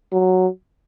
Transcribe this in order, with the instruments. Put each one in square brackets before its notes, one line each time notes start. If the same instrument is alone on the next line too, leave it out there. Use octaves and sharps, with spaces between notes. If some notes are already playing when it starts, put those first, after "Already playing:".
[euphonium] F#3